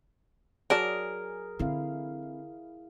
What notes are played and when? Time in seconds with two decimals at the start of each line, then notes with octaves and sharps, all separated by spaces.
0.70 F#3 G#4 A#4 D5 A5
1.59 D3 C4 E4 F5